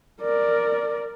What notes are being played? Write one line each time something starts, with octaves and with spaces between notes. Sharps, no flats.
A#4 D5